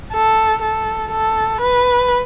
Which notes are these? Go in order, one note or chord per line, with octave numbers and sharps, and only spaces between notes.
A4
A4
A4
B4